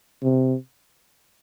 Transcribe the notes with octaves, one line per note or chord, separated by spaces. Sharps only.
C3